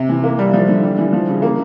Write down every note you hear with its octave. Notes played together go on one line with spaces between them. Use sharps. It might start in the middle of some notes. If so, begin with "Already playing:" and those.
Already playing: C3
E3
A#3
G3
F3
D3
G3
E3
F3
C#3
A#3